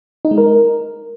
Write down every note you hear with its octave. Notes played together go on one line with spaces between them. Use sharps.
D#4
G#3
A#4